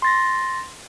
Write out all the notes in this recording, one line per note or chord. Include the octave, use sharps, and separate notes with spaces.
C6 A6 A#6